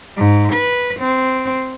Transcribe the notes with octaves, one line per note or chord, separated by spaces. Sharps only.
G#2
B4
C4